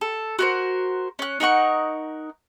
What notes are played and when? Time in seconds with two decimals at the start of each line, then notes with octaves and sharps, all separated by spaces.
0.01 A4
0.39 F#4 A#4 C5
1.19 C#4 F#6
1.40 D#4 A#4 F#5 C#6